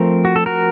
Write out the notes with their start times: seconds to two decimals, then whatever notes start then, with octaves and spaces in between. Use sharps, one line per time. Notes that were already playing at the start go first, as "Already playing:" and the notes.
Already playing: F3 A3 C4 A#4
0.25 F#4
0.36 A4
0.46 F#4 A#4